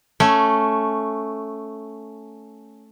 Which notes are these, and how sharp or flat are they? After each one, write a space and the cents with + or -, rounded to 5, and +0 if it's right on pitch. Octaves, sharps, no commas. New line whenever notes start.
A3 +0 C#4 +0